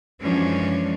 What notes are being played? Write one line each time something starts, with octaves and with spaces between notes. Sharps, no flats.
F#2 E3 F3 G#3 C#4 D4